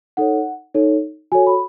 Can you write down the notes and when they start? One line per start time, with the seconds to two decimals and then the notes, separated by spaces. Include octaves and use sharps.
0.17 D#4 A4 C#5 F#5
0.74 D#4 A4 C#5
1.32 F#4 A4 C#5 G#5
1.47 B5